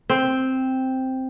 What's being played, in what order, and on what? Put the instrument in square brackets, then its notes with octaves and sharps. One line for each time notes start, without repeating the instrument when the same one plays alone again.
[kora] C4